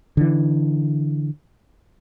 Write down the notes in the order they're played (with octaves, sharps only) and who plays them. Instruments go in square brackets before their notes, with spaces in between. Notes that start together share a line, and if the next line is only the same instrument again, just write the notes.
[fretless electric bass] D3 E3